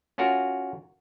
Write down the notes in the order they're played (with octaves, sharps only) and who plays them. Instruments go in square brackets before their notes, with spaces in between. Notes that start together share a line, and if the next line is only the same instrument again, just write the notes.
[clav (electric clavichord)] C#4 F4 F#4 A#4